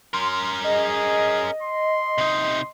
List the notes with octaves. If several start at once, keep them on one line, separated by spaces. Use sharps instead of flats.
C#4 A#4 C6
G#4 D#5
C6
C3 D#4